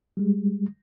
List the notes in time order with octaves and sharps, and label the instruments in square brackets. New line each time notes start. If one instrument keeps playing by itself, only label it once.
[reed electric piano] G3 G#3